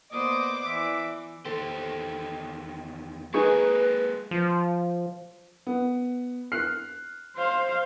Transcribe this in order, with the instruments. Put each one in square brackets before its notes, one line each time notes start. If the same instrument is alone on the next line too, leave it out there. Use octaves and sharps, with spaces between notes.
[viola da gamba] A#3 B3 C5 [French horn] D5 [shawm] D#5 [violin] D6
[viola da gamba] E3 [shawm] E5
[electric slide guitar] E2 D#3 G4 [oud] A4 C5
[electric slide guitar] G#3 A#3 [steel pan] D#4 G#4 C#6 [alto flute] B4
[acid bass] F3
[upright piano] B3
F6 F#6 C7
[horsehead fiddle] C5 F5